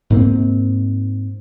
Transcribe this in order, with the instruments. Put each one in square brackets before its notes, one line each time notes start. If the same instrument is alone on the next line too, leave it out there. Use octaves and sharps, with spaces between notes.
[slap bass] G#2 A#3 C4